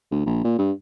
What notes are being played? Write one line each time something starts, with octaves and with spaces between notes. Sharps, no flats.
D2
A#1
A#2
G2